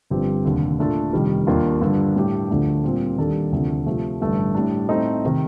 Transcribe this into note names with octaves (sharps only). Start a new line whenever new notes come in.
G1 G2 F3 C4 G4
F1 D#2 D3
A#2 A3 D4 F4 A4
F1 F2 D#3 G3
D#2 D#3 A#3 D4 F4
G2 D3 F3
A2 G3 D4 G4
D2 D3 F3 A3 D4
A#2 G3 C4
D#2 D#3 G3 D4 A4
D2 C3 F3 A3 D4
C3 F3 A3
A1 G2 D3 A3
A2 G3 D4
A2 A3 C4 D#4
C3 D#3